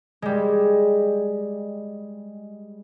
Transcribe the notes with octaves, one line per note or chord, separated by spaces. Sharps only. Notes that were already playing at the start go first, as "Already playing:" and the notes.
G3 G#3